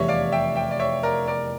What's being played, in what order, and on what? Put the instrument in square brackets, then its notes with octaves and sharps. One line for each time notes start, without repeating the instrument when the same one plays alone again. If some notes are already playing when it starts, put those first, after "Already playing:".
Already playing: [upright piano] F1 E2 E3 G3 [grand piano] C#5 E5
[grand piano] D5 F5
E5 G5
E5 G5
D5
C#5 E5
A#4 D5
A#4 D5